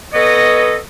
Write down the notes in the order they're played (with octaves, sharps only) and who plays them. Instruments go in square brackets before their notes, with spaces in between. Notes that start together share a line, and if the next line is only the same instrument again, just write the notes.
[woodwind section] B3 A4 B4 C#5 D#5